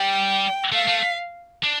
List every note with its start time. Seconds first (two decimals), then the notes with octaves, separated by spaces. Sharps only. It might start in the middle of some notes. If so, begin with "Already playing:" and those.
Already playing: G3 G5
0.72 A3 F5
0.87 A3
1.63 D4